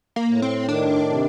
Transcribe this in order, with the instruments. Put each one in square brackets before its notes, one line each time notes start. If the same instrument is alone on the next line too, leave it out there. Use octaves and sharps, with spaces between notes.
[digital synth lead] A#3
[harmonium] A2
[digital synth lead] C4
[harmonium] D#3 [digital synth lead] D4
[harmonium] C3